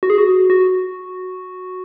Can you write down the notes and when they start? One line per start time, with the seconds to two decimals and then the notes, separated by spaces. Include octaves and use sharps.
0.03 F#4
0.10 G#4
0.18 F#4
0.50 F#4